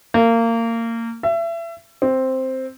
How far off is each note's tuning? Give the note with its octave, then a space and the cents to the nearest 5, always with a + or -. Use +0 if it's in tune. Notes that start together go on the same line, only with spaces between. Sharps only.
A#3 -25
E5 +30
C4 +0